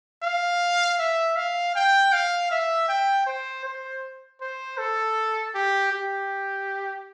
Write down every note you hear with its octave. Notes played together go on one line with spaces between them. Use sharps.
F5
E5
F5
G5
F5
E5
G5
C5
C5
C5
A4
G4
G4